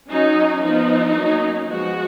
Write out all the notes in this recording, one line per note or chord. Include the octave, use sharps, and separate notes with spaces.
F#3 C#4 D#4
F3 B3 D#4
F#3 A#3 C#4
F3 G#3 B3 F#4